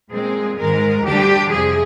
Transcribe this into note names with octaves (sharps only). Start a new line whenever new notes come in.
A#2 G#3 C4 G#4
G#2 D#3 G#3 A#4
D2 D3 G3 D4 G4
F2 C3 F3 G#4